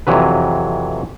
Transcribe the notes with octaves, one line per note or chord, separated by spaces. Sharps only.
F2 C3 E3 F#3 B4